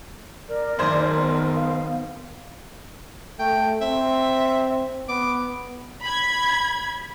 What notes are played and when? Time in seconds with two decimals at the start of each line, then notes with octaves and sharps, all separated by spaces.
0.49 A#4 D5
0.79 F#1 D#3 C5 G#6
1.14 B3
1.56 F5
3.39 A3 G5
3.82 C4 E5
5.09 B3 D6
6.02 B5 G#6